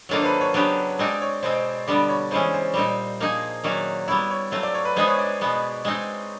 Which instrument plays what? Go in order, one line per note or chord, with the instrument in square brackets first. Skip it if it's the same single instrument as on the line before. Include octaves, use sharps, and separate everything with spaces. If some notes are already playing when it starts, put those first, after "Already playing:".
[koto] D#3 F#3 A#3 D4 F4 [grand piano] A4
[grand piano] C5
B4
C#5
[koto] C#3 F#3 B3 D4 G4
[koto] G#3 C4 D#4 [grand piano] D5
[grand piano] C#5
[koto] B2 G#3 C4 [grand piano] C5
[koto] D3 G3 B3 [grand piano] D5
[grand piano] C#5
[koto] C#3 E3 G#3 C#4 [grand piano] C5
[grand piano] C5
[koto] A#2 G3 C4 D#4
F3 A#3 D#4 G#4
[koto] D#3 F#3 A#3 C#4 F#4 [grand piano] D5
[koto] G3 B3 E4 [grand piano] C#5
[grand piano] C#5
[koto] F#3 A3 C4 F4
[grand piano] D5
C#5
B4
[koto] G#3 B3 D#4 G#4 [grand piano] C5
[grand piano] C#5
D5
[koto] B2 G#3 B3
G#3 C4 D#4